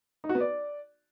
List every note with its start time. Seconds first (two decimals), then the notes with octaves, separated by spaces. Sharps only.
0.24 D#4
0.29 F#4
0.35 B3
0.40 D5